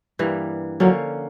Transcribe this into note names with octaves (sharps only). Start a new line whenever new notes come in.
G2 E3 G3 A#3
D3 F3 F#3 A#3 C#4